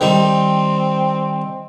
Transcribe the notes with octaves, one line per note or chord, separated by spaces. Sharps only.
D#3 G3 C4